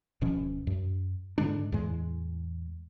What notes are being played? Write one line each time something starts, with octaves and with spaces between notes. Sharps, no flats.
D1 B2 F3 C#4
F#2
G#2 D3 G#3 D4
E2 A2 E3 G#3